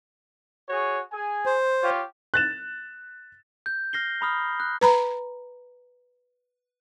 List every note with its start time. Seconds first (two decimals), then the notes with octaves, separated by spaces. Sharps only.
0.69 F#4 G#4 C#5
1.11 G#4 G#5
1.46 C5
1.83 F4 G4 C#5
2.34 F#6 A6 E7
3.66 G6
3.93 F6 A#6 C7 G7
4.21 A#5 B5 D#6 F6
4.60 F#6
4.81 B4 A#5 B5